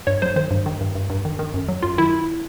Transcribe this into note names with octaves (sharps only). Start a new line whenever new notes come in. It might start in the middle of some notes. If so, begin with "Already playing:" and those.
G2 C#5
F#3 C5
D#3 C5
G2
D#3
G2
G2
G2
D#3
D#3
F#2
F#3
F#2 F4
D#3 E4